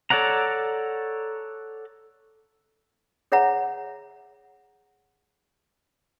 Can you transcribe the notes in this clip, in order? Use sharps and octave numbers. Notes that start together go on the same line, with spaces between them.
A4 C#5 D5 F#5 A#5
G#4 C#5 E5 F#5 A#5